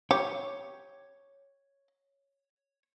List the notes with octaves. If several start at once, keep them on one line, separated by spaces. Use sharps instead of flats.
G4 C#5